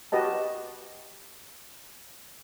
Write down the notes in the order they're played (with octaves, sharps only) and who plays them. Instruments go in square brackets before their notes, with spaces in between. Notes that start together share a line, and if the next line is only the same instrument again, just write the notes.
[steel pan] F#4 G4 B4 D#5 A5